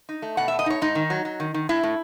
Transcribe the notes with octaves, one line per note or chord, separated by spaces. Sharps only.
D#4
A3
B2 F#5
A3 E5
D#5
D#4 C#5
G#2 D#4
D#3
F#3
F#3
D#3
D#3
A2 E4
A2